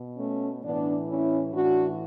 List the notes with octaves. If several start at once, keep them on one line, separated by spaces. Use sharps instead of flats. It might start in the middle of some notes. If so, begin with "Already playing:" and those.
Already playing: B2
A3 C#4
A2 E3 B3 D4
C#4 E4
A2 E3 D4 F#4